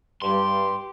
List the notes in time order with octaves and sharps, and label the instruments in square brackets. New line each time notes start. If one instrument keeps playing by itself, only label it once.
[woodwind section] G2 G3 [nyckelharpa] G4 [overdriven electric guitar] C6